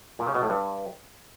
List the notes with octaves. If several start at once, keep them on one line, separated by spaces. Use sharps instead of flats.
A#2
C#3
B2
A2
G2